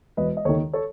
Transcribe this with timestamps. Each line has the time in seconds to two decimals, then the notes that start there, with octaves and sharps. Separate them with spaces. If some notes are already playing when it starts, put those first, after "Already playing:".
0.17 E1 B4 D#5
0.37 D#5
0.45 D#2 D#3 A4 C#5
0.73 A4 C#5